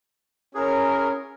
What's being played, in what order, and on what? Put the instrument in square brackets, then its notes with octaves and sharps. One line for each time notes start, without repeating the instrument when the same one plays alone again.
[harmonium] C#4 [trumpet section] E4 F#4 A#4 [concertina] G#4